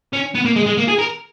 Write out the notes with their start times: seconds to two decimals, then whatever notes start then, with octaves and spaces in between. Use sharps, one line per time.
0.13 C#4
0.35 B3
0.45 A#3
0.56 G#3
0.66 G#3
0.77 A#3
0.88 G#4
0.99 A#4